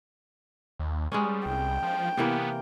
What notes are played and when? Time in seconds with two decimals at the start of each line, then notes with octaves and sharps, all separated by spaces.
0.79 D#2
1.12 G3 G#3 B3 C#4
1.46 C2 G5
1.83 F3
2.17 C3 E3 A#3 B3